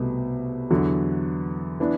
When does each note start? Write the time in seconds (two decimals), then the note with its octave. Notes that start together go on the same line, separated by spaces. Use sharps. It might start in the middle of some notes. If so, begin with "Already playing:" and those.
Already playing: C2 B2 A3
0.71 E2 D3 F#3
1.80 E3 B3 D4